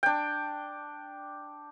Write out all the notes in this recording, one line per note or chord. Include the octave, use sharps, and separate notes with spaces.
D4 G5